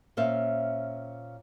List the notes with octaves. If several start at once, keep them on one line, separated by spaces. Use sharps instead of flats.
A#2 C#4 C5 E5 F5